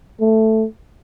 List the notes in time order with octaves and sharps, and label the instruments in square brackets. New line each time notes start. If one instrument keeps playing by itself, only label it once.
[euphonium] A3